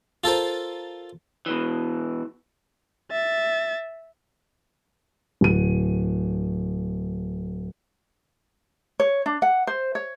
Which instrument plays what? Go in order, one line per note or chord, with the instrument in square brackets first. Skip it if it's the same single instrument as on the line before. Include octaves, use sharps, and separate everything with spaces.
[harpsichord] F4 A4 A#4 C5
[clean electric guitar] B2 E3
[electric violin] E5 A6
[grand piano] D1 D#7
[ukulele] C#5
D4
F#5
C5
C#5